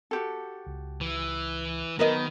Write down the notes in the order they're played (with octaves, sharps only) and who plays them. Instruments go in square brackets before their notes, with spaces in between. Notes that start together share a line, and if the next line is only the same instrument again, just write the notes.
[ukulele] F#4 G4 A4
[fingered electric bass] C#2
[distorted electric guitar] E3
[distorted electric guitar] D#3 [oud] F#3 B3 D#5 [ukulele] A#4